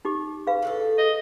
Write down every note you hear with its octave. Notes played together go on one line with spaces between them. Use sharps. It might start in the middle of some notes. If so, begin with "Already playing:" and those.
D#4 G4 D6
G#4 B4 F5
A2 F#4 A4
D#5